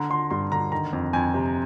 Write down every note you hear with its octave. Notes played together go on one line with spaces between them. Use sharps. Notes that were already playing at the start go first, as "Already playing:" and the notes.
Already playing: D3 A#5
D3 C6
G2 C6
D3 A#5
D#3 A#5
F2
F2 G#5
C3